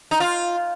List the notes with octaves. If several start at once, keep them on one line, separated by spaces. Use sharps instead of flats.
D#4
F4